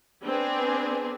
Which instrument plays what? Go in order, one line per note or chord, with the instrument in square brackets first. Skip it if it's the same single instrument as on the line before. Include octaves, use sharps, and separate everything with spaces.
[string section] B3 C4 D4 G#4 B4